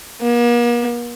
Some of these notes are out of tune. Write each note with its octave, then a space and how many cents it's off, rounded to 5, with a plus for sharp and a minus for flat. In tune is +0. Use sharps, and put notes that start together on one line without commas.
A#3 +45